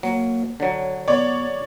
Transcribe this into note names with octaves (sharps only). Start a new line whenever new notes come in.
F#3 A#3
D3 F#3 C#5
B3 C#5 D5